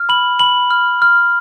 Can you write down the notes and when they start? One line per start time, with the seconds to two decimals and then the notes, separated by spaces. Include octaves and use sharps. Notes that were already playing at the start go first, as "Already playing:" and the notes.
Already playing: F6
0.09 B5 F#7
0.39 B5 F#7
0.70 F6
1.02 F6